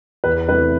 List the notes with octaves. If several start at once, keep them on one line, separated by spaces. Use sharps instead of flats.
E2 B4
C3 E3 A3 B4